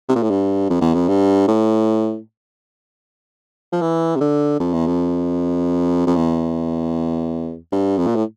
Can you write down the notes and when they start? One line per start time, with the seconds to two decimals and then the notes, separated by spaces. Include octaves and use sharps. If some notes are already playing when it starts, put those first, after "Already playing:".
0.09 C3
0.15 A#2
0.23 A2
0.30 G2
0.70 F2
0.81 E2
0.94 F2
1.08 G2
1.48 A2
3.72 F3
3.81 E3
4.16 C3
4.21 D3
4.60 F2
4.73 E2
4.87 F2
6.07 F2
6.16 E2
7.72 G2
7.98 F2
8.07 A#2
8.16 A2